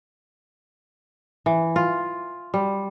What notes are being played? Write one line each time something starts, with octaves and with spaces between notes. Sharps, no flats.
E3
F4
G3